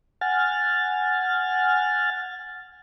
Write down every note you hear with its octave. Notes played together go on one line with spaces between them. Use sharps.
F#5 G#5 F6 A6